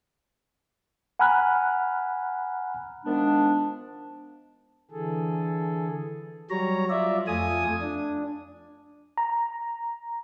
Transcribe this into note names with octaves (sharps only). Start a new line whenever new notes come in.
F#5 G#5 A#5 B5 F6 F#6
D#3 F3 G#3 B3 D4
D3 E3 G#4 A4
F#3 G3 C#5 A#5
F4 D5 E5
F2 A3 F4 G#5 D#6
D4
A#5